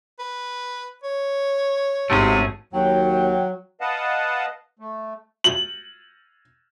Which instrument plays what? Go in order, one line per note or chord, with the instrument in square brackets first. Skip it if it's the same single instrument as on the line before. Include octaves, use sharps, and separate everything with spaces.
[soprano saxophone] B4
C#5
[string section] G#1 D2 [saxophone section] G#2 C3 [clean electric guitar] A3 C#4 G#4
[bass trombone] D#2 [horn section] F#3 [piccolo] G5
[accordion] B4 D#5 F5 F#5 A5
A3
[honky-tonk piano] F#7